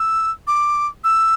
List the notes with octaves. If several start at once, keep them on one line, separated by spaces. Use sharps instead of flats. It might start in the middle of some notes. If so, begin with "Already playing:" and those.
Already playing: E6
D6
E6